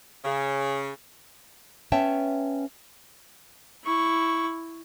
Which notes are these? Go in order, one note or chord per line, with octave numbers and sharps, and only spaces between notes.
C#3
B3 C#4 C#5 E5 G5 A5
E4 C#6